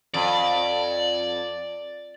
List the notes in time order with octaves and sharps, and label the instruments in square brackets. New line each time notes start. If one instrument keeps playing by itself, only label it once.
[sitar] F2 [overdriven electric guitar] D5